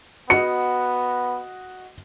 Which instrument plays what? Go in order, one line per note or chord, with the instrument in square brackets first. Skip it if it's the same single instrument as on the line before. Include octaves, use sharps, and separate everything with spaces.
[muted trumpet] B3 [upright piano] F#4 D#5 [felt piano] C#7